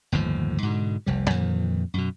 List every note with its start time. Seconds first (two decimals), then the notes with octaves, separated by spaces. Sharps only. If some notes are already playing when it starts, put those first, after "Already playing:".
0.12 G1 D#2 A2 F3
0.63 G#2 B2 D3
1.06 F1 C2 G3
1.30 F2 A#2 D#3 E3
1.94 F#2 B2